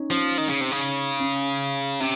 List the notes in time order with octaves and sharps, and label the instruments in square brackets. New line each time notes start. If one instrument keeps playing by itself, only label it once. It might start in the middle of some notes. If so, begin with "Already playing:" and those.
Already playing: [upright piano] C#4 D#4
[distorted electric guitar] F3 [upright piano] C#4
[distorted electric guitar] D#3
C#3
C3
C#3
[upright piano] C#4
[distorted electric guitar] C3 [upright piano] C#4